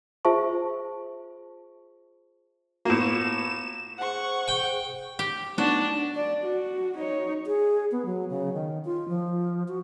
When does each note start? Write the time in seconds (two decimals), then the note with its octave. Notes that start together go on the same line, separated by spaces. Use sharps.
0.25 F4 G#4 C5 E5 A5 C#6
2.85 A2 A#3 B3 F4 F#4 E7
3.98 G#4 C5 F#5 C#6
4.48 G5
5.19 G4
5.58 A3 B3 D4 D#4 F#4
6.15 D5
6.44 F#4
6.97 D#4 C#5
7.47 G#4
7.92 B3
8.05 F#3
8.30 C#3
8.53 D#3
8.85 F4
9.08 F3
9.68 F#4